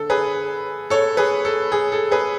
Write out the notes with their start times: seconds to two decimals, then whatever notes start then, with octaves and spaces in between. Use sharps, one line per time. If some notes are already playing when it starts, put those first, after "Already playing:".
Already playing: D3 A4
0.10 G#4 B4
0.90 A4 C#5
1.17 G#4 B4
1.45 A4
1.72 G#4
1.92 A4
2.11 G#4 B4